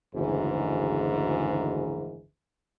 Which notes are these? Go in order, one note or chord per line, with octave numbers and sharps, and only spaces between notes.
F#1 D2 G#2 D#3 E3